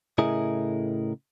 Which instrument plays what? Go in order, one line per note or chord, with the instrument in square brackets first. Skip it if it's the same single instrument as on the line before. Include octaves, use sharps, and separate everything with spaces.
[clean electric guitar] A2 C#3 E4 G#4 A#4 D#5